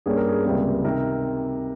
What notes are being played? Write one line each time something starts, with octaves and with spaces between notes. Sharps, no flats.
G2 G3 A#3 C#4 G#4
A#4
G#4
C#2 C3 G3 A#3
C3 D#3 A#4